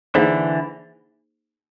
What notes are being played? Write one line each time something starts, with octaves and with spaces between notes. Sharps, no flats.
D3 E3 A#3 D#4 G#4 C5